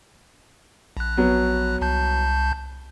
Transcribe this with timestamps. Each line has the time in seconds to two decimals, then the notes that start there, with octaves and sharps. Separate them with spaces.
0.97 A#1 F#6
1.17 F#3 B3
1.81 C2 A5 G6